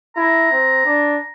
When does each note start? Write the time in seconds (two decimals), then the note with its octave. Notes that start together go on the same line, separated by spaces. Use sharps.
0.16 E4 A#5
0.52 C4
0.86 D4